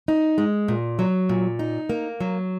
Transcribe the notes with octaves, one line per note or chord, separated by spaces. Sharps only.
D#4
G#3
A#2
F#3
A#2
D#4
A#3
F#3